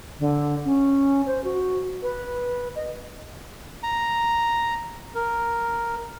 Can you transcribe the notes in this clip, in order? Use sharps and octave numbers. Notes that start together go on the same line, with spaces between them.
D3
C#4
C5
F#4
B4
D#5
A#5
A#4